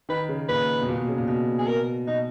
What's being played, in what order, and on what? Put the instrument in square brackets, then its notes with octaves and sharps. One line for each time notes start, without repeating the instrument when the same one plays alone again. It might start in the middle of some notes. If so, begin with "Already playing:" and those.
[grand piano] D#3 [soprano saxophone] B4
[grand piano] C#3
[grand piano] A#2 [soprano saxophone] B4
[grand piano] B2
A#2
B2
C#3
A#2
B2
[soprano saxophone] G#4
A#4
[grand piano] B2 [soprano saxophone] D#4